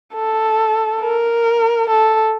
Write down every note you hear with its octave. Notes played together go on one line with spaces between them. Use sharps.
A4
A#4
A4